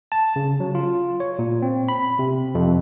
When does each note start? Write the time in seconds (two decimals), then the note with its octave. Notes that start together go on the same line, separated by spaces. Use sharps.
0.12 A5
0.36 C#3
0.60 F#3
0.75 F4
1.20 C#5
1.39 A#2
1.62 C4
1.89 B5
2.19 C3
2.55 F2